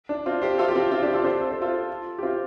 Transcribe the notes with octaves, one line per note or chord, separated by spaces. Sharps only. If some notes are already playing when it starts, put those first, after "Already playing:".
D4
C4 F4
G4 C5
F4 A4
G4
C4 F4
C4 F4
D4 G4
F4 A4
G4 C5
A4
C5
F4 A4
G4
C4 F4